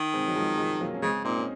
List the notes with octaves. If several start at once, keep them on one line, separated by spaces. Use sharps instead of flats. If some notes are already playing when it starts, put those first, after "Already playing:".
Already playing: D#3
G#3 C4
F#3
F3 G#3
F3 G#3
F#3 A#3
C#4
C#3 G#3 C4
A#2 C4 D#4
C#4